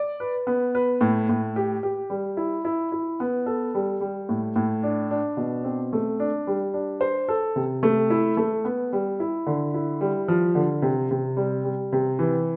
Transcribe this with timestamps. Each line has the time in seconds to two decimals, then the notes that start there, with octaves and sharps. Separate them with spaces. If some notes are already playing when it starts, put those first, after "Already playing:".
Already playing: D5
0.20 B4
0.47 B3
0.75 B4
1.01 A2
1.29 A2
1.56 G4
1.83 G4
2.10 G3
2.37 E4
2.65 E4
2.92 E4
3.20 B3
3.46 A4
3.75 G3
4.01 G3
4.29 A2
4.56 A2
4.83 D4
5.11 D4
5.37 B2
5.64 C4
5.93 A3
6.20 D4
6.47 G3
6.74 D4
7.01 C5
7.28 A4
7.56 C3
7.83 A3
8.10 E4
8.37 A3
8.65 B3
8.93 G3
9.20 E4
9.47 D3
9.74 E4
10.01 G3
10.28 F3
10.55 D3
10.82 C3
11.11 C3
11.37 G3
11.65 G3
11.93 C3
12.19 E3